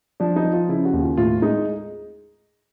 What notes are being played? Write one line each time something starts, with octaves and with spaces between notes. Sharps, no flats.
F3 D4
D#4
F3
F4
C#3 E4
F#4
D#2
F4
A2 F4
G#3 D#4